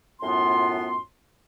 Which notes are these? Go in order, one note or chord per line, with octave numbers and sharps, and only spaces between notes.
F#2 A2 B3 F4 C6